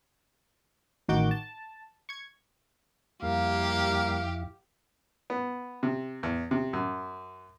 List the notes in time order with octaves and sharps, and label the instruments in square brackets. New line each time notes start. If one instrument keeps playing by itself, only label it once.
[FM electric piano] A1 D#3 F#4 G5 D6 G6
A5
C#6 G#6
[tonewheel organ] F2 E4 [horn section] G3 A#3 [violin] G4 [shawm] F5
[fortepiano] B3
C3
E2
C3
F#2